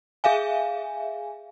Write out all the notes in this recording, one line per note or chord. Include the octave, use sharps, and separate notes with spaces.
G#4 E5 F5 G#5